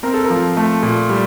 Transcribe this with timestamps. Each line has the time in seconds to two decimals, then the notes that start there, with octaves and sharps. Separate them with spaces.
0.03 C4 A#4
0.14 A4
0.24 A#4
0.30 F3
0.57 A3
0.83 A#2
1.09 G3